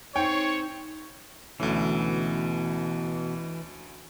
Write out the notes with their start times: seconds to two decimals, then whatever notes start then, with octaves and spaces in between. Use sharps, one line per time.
0.16 C4 D#4 C5 C#5 G5
1.60 D2 B2 E3 A3 C#4